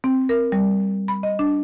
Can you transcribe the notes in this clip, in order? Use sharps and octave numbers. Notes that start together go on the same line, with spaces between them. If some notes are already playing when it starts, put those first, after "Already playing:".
C4
A#4
G3
B5
D#5
D4